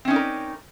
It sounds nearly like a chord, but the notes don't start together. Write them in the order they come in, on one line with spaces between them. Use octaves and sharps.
C4 C#4 D#4 D5 A#4